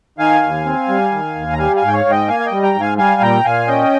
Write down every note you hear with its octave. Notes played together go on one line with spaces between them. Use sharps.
D#3 F5 G#5
D#2
C4
G3
D#3
D#2
A#5
G3 F5 G#5
F5 G#5
G#2
G5
C#5 F5
G#2
D#5 G5
A#3 F5 G#5
F5
D#5 G5
G3
G5 A#5
G#2
F5 G#5
G3 F5 G#5
A#2 G5 A#5
A#2 F5 G#5
C#4 D#5 G5